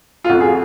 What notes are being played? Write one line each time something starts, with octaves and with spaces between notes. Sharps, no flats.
F4
F2 F#4
G#4